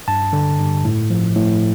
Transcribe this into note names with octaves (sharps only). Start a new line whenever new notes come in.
G2 A5
D3
G2
A2
F3
A2